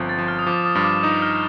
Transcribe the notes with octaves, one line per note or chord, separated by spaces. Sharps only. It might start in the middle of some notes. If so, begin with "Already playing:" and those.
Already playing: G1 F3 C4
A6
F3
F6
D#6
F3 D6
D#6
G2
D6
D#4 D#6
F6